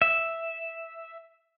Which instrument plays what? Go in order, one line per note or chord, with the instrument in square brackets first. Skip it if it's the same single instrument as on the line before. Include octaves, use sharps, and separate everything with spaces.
[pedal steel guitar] E5